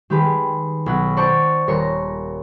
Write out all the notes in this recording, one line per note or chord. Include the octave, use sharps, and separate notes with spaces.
D#3 G#3 G4 B4
G#3
B1 F#5
C5 D5 A5 C#6 G6
D#1 A#4 C#5 C6 A#6 C#7